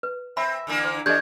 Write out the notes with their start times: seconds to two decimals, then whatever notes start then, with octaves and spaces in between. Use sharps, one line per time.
0.03 B4
0.37 C4 E5 B5
0.67 D3 E3 A#3
0.84 C5
1.06 E3 D4 G4 A4 D#5 G6 G#6